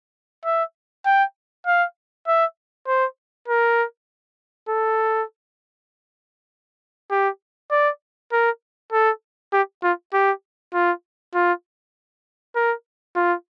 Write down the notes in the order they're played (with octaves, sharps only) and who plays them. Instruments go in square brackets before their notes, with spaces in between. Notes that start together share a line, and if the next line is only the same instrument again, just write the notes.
[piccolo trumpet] E5
G5
F5
E5
C5
A#4
A4
G4
D5
A#4
A4
G4
F4
G4
F4
F4
A#4
F4